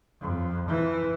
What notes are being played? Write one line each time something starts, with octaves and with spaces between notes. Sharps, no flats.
F2
E3